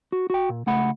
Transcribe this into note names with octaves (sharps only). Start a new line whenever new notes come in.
F#4
F#4 G5
A#2
C#2 A3 F#5 B5